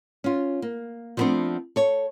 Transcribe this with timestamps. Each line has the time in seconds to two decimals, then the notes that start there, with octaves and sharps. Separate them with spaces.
0.24 C#4 F4
0.62 A#3
1.17 F3 F#3 A3 B3 C4 D4
1.76 A4 C#5